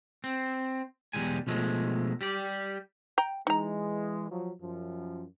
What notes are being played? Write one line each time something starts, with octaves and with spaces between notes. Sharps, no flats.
C4
B1 E2 D#3 G3 G#3 G#5
B2 F3 G#3 A3
G3 G4 D5
G5 A#5
E3 G#3 D#4 A#5
F3 F#3
F#2 F3